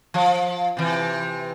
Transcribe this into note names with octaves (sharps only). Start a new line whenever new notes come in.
F3
C3 E3